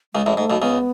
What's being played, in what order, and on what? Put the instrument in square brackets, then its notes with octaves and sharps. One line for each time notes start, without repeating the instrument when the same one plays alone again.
[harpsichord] C#2 C#3 [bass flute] G#3
[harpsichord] A1 A2
[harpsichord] G#2 [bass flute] A3
[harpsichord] B1 B2
[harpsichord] C#2 C#3 [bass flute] B3